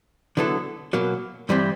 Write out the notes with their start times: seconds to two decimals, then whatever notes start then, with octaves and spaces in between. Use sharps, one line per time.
0.37 D3 F#3 B3 E4 A4
0.93 B2 F#3 A#3
1.49 G2 E3 G3 C4 E4